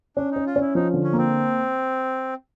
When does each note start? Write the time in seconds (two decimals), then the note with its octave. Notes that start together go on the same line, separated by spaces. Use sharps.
0.16 C#4 D4
0.31 C#4 D#4
0.46 F4
0.56 C#4 E4
0.75 F3 D#4
0.94 D3
1.04 C#4
1.13 A#3
1.18 C4